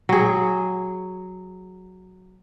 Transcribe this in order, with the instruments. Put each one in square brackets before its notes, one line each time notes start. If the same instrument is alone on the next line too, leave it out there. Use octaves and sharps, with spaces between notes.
[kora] F#3 G#4